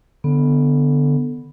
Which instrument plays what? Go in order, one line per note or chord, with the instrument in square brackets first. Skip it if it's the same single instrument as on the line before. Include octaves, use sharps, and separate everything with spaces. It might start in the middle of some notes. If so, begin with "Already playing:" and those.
[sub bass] D3 [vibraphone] B3